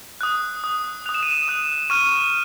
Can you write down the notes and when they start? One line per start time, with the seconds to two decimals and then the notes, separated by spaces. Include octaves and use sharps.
0.21 D#6 F#6
0.64 D#6 F#6
1.06 D#6 F#6 F7
1.14 E7
1.23 D#7
1.31 E7
1.48 D#6 F#6
1.90 C#6 F6 D#7